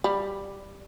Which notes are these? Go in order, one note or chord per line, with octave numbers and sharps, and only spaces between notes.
G3